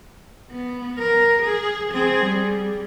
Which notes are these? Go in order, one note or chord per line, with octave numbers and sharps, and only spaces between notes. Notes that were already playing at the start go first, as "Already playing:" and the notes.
B3
A#4
G#4
C4 G#4
G3